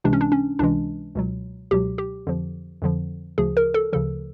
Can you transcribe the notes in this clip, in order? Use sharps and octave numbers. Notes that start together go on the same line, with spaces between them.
C#2 C3 E3 G#3 D4
C#4
D4
C#4
C#2 C3 E3 G#3 D4
C#2 B2 F#3
C#2 B2 F#3 G4
G4
F2 D3 F3
F2 D3 F3
D2 C#3 F3 G#4
A#4
A4
D2 C#3 F3 A4